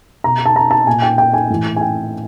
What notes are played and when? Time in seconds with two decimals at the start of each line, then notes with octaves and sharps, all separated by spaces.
0.24 B2 A#5
0.46 A5
0.56 A#5
0.71 A5
0.87 A#2 G#5
1.02 G5
1.18 G5
1.34 G#5
1.50 A2 E3
1.77 G#5
1.81 G5